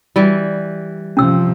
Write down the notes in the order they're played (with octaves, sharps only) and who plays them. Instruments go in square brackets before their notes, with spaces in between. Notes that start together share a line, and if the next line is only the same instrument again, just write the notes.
[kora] E3 G3
[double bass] C3 F3 [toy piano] C#4 E6